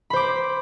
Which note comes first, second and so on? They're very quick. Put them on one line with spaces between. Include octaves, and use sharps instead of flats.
B5 C5 D6